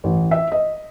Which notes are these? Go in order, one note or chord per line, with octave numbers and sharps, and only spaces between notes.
A1
E5
D#5